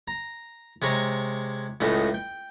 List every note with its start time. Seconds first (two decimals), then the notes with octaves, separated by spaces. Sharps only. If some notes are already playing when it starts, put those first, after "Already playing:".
0.08 A#5
0.82 C3 G#3 C#5 A#5
1.81 C#2 A2 C#3 D#5
2.14 G5